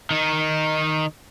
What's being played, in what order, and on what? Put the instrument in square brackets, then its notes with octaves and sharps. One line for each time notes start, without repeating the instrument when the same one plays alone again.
[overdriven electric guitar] D#3 D#4